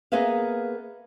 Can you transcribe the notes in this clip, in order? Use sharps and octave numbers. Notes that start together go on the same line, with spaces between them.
A#3 B3 G#4 B4 E5 F5